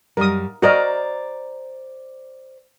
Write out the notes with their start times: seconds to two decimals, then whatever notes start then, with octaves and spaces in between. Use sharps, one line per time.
0.17 F#2 G3 A#4 D#6
0.62 F#4 A#4 C5 D5 D#5 A#5